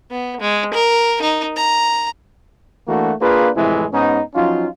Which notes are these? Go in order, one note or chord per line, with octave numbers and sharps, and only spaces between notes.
B3
G#3
A#4
D#4
A#5
E3 A3 A#3 D4 F#4
A#3 D4 F4 G#4 B4
F2 A2 C3 E3 G#3 E4
G#2 B3 C#4 D#4
F3 F#3 C#4 D#4 F4